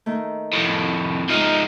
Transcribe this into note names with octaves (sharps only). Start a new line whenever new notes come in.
D#3 A3
F2 A2
G#2 F3 D#4 F6 F#6